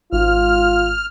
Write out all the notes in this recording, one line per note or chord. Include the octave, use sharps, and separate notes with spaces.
G#1 F4 F6